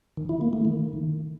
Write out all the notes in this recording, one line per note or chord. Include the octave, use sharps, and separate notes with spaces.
D#3
E4
A#3
A3
D#3